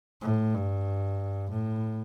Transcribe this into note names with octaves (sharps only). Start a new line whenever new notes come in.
A2
G2
A2